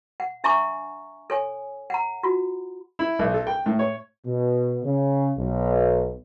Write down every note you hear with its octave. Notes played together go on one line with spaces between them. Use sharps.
F#5
D4 E5 G#5 A#5 C#6 D6
A4 C#5 G#5
F#5 A#5
F4 F#4
E4
B1
A4
G5
A2
C#5
B2
C#3
B1